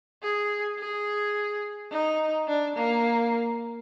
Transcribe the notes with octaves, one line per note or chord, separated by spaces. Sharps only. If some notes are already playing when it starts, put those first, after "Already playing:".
G#4
G#4
D#4
D4
A#3